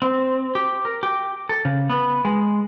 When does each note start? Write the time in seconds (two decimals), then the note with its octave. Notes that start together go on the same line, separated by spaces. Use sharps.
0.02 C4
0.55 G4
0.85 A#4
1.03 G4
1.49 A4
1.65 C#3
1.90 B3
2.25 G#3